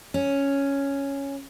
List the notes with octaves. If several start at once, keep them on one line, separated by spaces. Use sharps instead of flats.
C#4